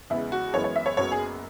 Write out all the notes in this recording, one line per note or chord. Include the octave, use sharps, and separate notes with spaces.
E2 C#3 G#3 B3 E4
F#4
F#2 E3 G#3 B3 C#5
C#5
E5
C#5
F#1 F#2 F#3 B3 C#5
G#4